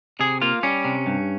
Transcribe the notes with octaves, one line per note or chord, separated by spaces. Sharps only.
C3 G#4
A#3 F4
G3 C#4
C3
G2